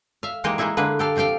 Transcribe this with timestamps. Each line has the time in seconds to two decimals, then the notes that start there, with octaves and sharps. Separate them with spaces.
0.23 E5 F5
0.44 E3 G#3 A#3 D#4 G4 D#5
0.58 G#3 A#3 D#4 E4 G#4
0.77 D3 G#3 A#3 B4
0.99 G4 A4 F5
1.16 C3 F3 G4 F5 G5